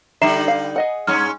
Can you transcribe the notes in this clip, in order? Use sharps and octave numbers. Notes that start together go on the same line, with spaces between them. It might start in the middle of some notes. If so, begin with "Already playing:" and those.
D3 G3 D#4 E5 A#5 C7 E7
F5
G#4 D#5 F#5
G2 G#3 C#4 F6